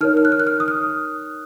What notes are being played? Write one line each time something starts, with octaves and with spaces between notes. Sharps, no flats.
D#4 A#4 C#5 F6
F6
F#6
F6
F#6
F6
D#6
F6